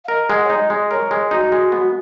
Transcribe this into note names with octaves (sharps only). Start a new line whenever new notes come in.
F5
A#4 D#5
G#3 F#5
C#5
D#4 D#5
G#3
A#4 C#5
G#3
D#4 F#4
G#3
B3